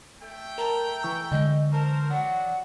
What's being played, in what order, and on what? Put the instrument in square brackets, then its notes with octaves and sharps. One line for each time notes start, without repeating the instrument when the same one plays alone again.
[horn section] A3 G5
[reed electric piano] A#4 A5 [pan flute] A#5
[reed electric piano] E3 C#6 E6
[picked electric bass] D3 G#3 [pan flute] D#5
[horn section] A#4 C5 [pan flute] A5
[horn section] F#3 D4 F#4 [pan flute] F#5